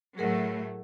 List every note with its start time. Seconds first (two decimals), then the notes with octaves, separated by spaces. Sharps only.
0.18 A2 F#3 A3 G#4 A#4 F#5